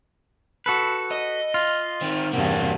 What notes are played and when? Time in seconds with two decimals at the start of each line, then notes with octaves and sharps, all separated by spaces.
0.66 F#4 A4 B4
1.12 D#5
1.54 F4
2.01 D#3 C4
2.33 E2 G2 C3 A#3 F#4